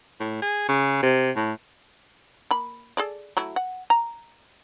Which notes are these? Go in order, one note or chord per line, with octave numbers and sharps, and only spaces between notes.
A2
G#4
C#3
C3
A2
A#3 B5
G#4 A4 D5
F#3 A3 E4
F#5
A#5